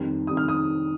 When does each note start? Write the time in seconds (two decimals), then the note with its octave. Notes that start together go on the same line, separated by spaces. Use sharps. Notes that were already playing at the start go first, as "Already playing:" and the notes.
Already playing: F2 D#3 G3
0.27 F2 D#3 G3 D#6
0.37 F6
0.48 D#6